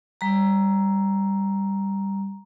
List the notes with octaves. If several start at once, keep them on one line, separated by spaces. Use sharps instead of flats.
G3 A#5